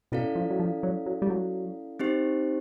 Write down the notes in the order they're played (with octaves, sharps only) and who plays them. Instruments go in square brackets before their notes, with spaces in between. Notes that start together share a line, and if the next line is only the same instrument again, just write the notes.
[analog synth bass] B2 [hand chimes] C#4 E4 A4 D5 F5
[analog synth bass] F3
F#3
F3
F#3
F#3
G3
F#3
[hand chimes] C4 D#4 G4 C5